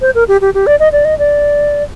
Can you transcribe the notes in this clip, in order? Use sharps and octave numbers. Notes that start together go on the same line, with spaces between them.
C5
A#4
G4
G4
G4
D5
D#5
D5
D#5
D5